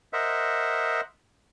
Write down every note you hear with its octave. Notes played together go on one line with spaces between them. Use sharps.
A#4 C5 D#5 E5 F#5